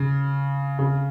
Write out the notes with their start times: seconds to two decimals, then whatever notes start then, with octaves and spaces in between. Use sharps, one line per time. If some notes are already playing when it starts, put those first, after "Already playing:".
Already playing: C#3
0.79 C#3